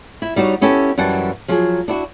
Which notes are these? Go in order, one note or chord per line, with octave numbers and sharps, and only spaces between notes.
E4
G3 D#4 F#4 C#5
B3 C#4 E4 G4 A4
F#2 E3 G3 F#5 A5
F3 F#3 G#4
D4 E4 F#4